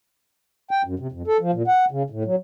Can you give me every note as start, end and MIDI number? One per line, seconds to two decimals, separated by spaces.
0.71 0.82 79
0.85 0.95 42
0.99 1.07 48
1.12 1.22 41
1.27 1.37 69
1.41 1.51 53
1.53 1.62 46
1.68 1.85 78
1.91 2.03 49
2.10 2.23 45
2.25 2.35 54